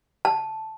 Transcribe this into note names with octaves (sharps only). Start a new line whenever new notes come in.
A5